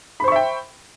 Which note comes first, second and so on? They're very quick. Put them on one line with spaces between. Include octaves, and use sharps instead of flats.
B5 C5 C#6 E5 G5